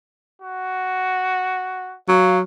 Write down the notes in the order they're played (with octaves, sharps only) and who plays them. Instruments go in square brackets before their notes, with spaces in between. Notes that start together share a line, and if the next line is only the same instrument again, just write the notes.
[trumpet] F#4
[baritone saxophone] F#3 [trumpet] F5